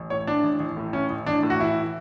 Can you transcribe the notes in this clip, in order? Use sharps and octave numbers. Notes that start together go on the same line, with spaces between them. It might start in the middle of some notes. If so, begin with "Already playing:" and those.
Already playing: A1
A2 C#5
E3 D4
A1
A1
A2
E3 C#4
A1
A1 D4
A2
F#4
E3 E4